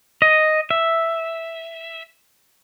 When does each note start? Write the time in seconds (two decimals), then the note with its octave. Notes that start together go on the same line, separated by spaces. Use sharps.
0.22 D#5
0.71 E5